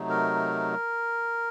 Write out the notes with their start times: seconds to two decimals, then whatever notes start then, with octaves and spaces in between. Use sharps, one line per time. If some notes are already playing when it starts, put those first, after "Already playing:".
Already playing: C3 F#3 A3 D#4
0.10 A#4